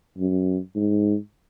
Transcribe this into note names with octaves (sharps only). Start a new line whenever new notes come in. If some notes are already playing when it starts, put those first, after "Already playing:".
F#2
G#2